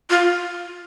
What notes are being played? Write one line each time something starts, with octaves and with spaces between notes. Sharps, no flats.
F4